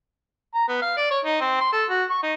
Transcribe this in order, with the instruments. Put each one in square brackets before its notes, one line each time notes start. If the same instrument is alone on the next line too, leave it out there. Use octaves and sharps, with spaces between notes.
[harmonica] A#5
B3
F5
D5
C#5
D#4
C4
C6
A4
F#4
C#6
D#4